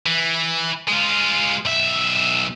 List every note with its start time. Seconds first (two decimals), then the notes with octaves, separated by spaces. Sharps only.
0.06 E3
0.88 G#3 F4
1.65 B1 E5